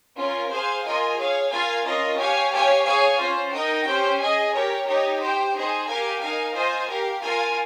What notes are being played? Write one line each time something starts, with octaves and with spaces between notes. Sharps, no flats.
C#4 F4 A#4
G#4 C5 F5 G#5
F4 A#4 D#5 G#5
G#4 C#5 F5
F4 A#4 F5 G#5
C#4 F4 A#4 D#5
G4 C#5 F5 G#5
G4 C#5 F5 G#5
G#4 C#5 F5 G#5
C#4 F4 C5
D#4 A#4 D#5 G5
C#4 G4 C5 G5
G#4 D#5 G#5
G4 A#4 C#5
D#4 G4 C#5
G4 C5 G5
D#4 G#4 C5
G4 A#4 F5 G#5
D#4 A#4 F5 G#5
F4 C5 D#5 G#5
G4 A#4 F5
F4 A#4 F5 G#5